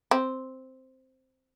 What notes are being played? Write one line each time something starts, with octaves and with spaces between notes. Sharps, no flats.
C4